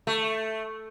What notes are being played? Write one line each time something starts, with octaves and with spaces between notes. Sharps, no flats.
A3